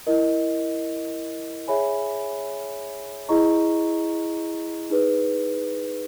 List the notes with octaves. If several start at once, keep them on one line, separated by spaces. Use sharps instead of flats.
E4 A#4 D#5
G#4 C#5 E5 G#5 B5
E4 G#4 D#5 A#5 C#6
D#4 G#4 B4